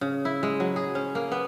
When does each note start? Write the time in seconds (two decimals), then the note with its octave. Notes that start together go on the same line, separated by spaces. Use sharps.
0.01 C#3
0.25 E4
0.43 G#3
0.60 F#3
0.76 G#4
0.95 C#4
1.15 A#3
1.32 B3